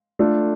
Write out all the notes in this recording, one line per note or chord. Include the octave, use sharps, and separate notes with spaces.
A3 D4 F4 A4